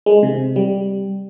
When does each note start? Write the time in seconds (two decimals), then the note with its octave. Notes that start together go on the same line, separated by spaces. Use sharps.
0.06 G#3
0.23 C3
0.56 G3